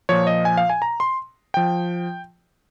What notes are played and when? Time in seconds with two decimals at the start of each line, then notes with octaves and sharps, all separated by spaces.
0.09 A#2 F3 C#5
0.27 D#5
0.45 G#5
0.57 F5
0.70 G#5
0.82 A#5
1.00 C6
1.54 F3 G5